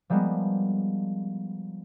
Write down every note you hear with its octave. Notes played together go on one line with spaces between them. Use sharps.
F3 G3 G#3 A#3 B3